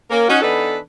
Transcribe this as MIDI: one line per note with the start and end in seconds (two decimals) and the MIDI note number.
0.10 0.26 58
0.10 0.26 61
0.10 0.26 70
0.29 0.41 61
0.29 0.41 63
0.29 0.41 66
0.42 0.78 52
0.42 0.78 59
0.42 0.78 62
0.42 0.78 63
0.42 0.78 69
0.42 0.78 71